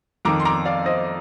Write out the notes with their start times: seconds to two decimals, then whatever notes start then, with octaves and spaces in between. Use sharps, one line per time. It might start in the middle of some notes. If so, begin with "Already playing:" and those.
0.25 F2 D#3 A#5 D6
0.40 C6
0.45 A#5 D6
0.65 D5 F5
0.86 C5 D#5